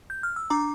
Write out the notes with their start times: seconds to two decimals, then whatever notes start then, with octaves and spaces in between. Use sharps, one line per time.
0.10 G6
0.23 F6
0.36 E6
0.50 D4 A#5 D6